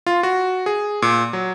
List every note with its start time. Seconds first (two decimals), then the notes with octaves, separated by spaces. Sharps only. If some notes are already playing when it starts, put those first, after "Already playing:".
0.07 F4
0.23 F#4
0.66 G#4
1.02 A#2
1.33 F#3